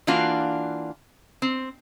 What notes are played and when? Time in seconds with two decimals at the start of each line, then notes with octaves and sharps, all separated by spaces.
0.07 E3 A#3 D4 F4 F#4
1.42 C4